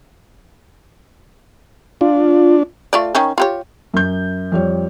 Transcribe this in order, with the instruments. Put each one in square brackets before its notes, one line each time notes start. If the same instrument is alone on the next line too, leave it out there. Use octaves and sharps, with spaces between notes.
[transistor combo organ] D4 [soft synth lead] F4
[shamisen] A3 F4 D5
D#3 C#4
F4 G4 C#5
[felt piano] F#2 G6
F2 G3 C#5